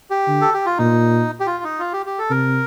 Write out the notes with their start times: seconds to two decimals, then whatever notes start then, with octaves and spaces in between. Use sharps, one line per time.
0.11 G4
0.28 D3
0.41 A4
0.54 G4
0.66 F4
0.78 A#2 D#4
1.40 G4
1.47 F4
1.64 D#4
1.79 F4
1.93 G4
2.06 G4
2.19 A4
2.30 C3 A#4